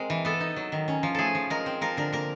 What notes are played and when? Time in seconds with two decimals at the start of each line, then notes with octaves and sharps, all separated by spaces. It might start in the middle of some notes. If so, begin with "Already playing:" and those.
Already playing: G#3 C4 A#4
0.10 E3
0.25 B3 A4
0.40 D#4
0.56 F#3
0.72 D#3
0.88 C#4
1.03 F3
1.15 A3 G#4 A4
1.35 F3
1.50 G#3 A#4
1.66 C4
1.81 F3 A#4
1.97 D3 A#4
2.13 A#3 A#4